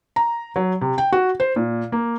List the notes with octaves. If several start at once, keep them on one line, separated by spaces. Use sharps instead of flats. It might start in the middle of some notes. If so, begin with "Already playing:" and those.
A#5
F#3
C3
G5
F#4
C5
A#2
A#3